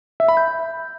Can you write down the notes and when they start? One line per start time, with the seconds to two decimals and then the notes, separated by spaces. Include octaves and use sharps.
0.20 E5
0.28 B5
0.37 G6